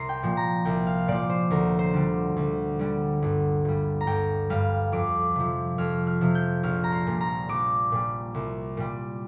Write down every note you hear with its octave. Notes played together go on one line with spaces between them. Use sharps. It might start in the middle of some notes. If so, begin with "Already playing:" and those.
Already playing: C2 A#5 C6
G5
A#2 F3
A#5
C2 G5
F5
A#2 F3 D5
C5
D2 A#4
C5
D3 G3
D2
D3 G3
G1
G2 G3
A#5
G1 G5
G2 G3 F5
F2 D6
C3 F3
F2 F6
F6
C3 F3
G6
A#1 F6
A#5
C6
A#2 G3
A#5
A#1 D6
A#2 G3
C2
A#2 G3